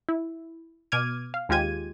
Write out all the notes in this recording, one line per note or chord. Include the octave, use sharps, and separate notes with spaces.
E4
B2 D6 F6 G#6 D#7
F5
D#2 G#3 F4 G4 G#6 D#7